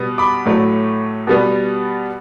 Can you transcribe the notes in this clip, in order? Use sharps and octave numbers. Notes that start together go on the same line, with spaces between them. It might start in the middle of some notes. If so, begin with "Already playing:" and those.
Already playing: B2 G3 B3
B5 D6
A2 F#3 A3
B2 G3 B3